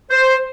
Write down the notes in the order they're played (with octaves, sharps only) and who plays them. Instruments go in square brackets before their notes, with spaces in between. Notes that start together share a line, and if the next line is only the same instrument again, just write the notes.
[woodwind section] C5